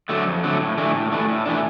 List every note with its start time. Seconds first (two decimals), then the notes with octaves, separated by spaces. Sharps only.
0.09 D3 F#3 A3
0.26 F2
0.44 D3 F#3 A3
0.60 A2
0.77 E3 A3 D4
0.94 A2
1.12 E3 A3 D4
1.29 A2
1.45 E3 A3 D4